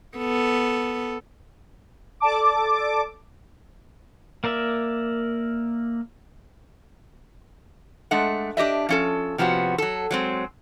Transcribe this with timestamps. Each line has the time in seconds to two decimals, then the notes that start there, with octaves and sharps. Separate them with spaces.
0.18 B3 A4
2.20 A4 D5 A5 D6
4.44 A#3 A#4 D5 E5
8.11 G#3 A3 D4 F#5
8.57 D4 G4 D#5 E5
8.89 F3 C#4 A4
9.38 C3 F3 B3 C#4 F#4
9.78 F#3 A4
10.11 F#3 G#3 C4